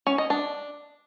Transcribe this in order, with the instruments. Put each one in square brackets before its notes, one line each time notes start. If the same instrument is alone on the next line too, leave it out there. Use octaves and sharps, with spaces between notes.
[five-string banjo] C#4
D#5
D4